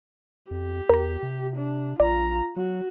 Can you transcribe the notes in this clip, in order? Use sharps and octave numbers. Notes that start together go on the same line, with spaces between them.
F2 G4
E2 A#4 A#5
C3
D4
A#1 F4 D5 A#5
F#3 F#4